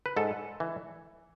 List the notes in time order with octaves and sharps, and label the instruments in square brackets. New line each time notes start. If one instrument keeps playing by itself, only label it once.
[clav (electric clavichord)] B4
G#2 A4
E3